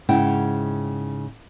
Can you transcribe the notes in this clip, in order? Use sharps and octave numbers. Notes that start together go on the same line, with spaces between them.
G#2 C#3 E4 F#5 G5